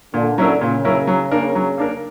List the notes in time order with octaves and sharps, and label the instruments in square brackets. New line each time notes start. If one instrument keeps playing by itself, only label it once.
[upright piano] A#2 [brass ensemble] D3
[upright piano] F#3 C#4 E4 A#4
[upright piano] A#2 [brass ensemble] C#3
[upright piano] F#3 C#4 E4 A#4
F#3
A#3 D4 A#4
F#3
A#3 D4 A#4